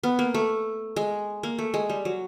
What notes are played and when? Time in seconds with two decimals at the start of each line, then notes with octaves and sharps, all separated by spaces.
0.03 B3
0.19 A#3
0.34 A3
0.96 G#3
1.43 A#3
1.59 A3
1.74 G#3
1.89 G3
2.05 F#3